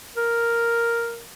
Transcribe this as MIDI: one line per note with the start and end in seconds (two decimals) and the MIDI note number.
0.17 1.20 70